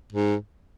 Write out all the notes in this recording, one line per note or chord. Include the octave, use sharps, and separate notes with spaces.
G#2